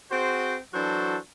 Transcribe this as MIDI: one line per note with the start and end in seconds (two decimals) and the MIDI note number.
0.11 0.56 60
0.11 0.56 66
0.11 0.56 68
0.11 0.56 72
0.74 1.17 52
0.74 1.17 54
0.74 1.17 62
0.74 1.17 66
0.74 1.17 69
0.74 1.17 72